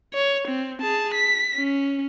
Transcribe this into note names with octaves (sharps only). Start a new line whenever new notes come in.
C#5
C4
G#4 A5
B6
C#4